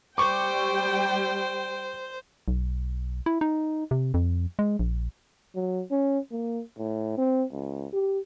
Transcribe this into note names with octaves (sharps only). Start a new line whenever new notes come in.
G3 C5 G5 C#6 D6
B1
E4
D#4
C3
F2
G#3
A#1
F#3
C#4
A#3
A2
C4
C#2
G4